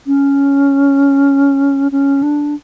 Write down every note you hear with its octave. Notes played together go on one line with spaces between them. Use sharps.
C#4
C#4
D4